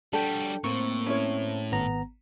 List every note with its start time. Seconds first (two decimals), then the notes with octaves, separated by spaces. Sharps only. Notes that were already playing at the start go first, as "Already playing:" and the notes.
0.13 G3 D4 F#4 A4 G5
0.64 A2 A#3 C4 C#6
1.06 C#4 E4 C#5
1.72 G#1 B3 A#5